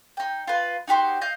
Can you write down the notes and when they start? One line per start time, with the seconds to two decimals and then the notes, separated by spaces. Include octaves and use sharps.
0.17 D#4 G5
0.47 F4 B4
0.88 D#4 F#4 G4 C5
1.21 D#5 F5 G6